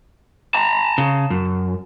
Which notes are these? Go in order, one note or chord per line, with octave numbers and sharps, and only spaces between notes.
A5 A#5
C#3
F#2